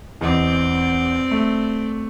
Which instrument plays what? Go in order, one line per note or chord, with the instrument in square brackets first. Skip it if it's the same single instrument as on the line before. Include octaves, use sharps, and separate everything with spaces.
[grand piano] E2 D#5 [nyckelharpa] C4 D5
[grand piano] A3